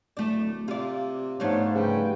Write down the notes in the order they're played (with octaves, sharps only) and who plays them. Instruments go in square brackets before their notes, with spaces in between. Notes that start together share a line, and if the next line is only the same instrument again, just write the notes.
[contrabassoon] D1 [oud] A3 D5
[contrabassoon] C3 [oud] F4 D5
[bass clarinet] G#2 [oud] F3 A3 F5 [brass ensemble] B3 D4 C#5
[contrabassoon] C#3 [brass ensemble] G3 B4 G5